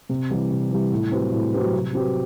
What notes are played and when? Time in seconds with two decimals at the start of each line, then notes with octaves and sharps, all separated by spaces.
0.09 C3
0.30 E3 G3
0.51 C3
0.71 E3 G3
0.92 A2
1.12 F#3 C4 G4 B4
1.32 A2
1.53 F#3 C4 G4 B4
1.73 C3
1.93 F#3 C4 G4 B4